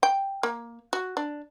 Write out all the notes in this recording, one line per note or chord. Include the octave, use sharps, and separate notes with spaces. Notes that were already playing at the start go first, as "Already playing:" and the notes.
G5
A#3
F#4
D4